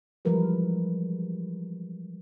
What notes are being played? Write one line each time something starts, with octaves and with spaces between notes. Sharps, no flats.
E3 F3 G3 G#3 A#4 B4